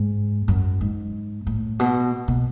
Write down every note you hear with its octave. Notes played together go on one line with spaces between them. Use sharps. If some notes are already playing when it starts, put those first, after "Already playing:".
Already playing: G#2
F#2
G#2
A2
B2
B2